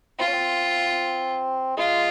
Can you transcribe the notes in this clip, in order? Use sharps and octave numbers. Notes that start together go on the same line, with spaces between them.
C4 F4
C#4
C4
G#3 F4